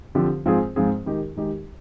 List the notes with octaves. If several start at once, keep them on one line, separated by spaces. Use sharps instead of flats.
D3 F3 C4 G4
G#2 F3 C4 F4 G#4
G#2 F3 C4 F4 G#4
D#3 G#3 D#4 G4
D#3 G#3 D#4 G4